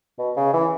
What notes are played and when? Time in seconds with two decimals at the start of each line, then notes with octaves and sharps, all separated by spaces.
0.18 B2
0.37 C#3
0.53 E3